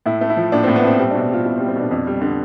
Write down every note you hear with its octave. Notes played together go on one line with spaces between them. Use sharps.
A2 E4
A3
E4
F3
A2 D4
A2 C4
B3
A3 C4
G3 C4
D4
B2
D4
G3 F4
B2 E4
C4
G3
C4
B2 D4
F2
G3
D3